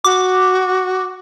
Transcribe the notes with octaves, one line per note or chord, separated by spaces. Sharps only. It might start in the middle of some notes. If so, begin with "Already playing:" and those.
F#4 D6